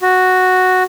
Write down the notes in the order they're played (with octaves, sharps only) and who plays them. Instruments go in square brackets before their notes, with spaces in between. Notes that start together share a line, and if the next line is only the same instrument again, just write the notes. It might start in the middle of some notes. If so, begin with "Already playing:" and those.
[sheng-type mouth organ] F#4